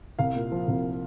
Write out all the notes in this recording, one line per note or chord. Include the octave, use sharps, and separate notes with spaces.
C2 F5
A#2
F3
C2